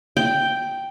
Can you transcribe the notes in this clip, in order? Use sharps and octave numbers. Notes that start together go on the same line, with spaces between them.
G5